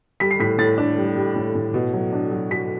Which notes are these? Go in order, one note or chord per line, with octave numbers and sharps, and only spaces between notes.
G3 B6
C7
A2 B6
A2 A6
D4
G3
G3
A2
A2
B2
F#3
D4
F#3
F#3 B6